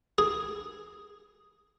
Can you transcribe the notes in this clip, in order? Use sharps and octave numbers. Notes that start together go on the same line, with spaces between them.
G#4